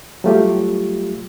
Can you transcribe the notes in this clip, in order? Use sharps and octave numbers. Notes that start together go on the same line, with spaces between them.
F#3 G3 A3 F4 G4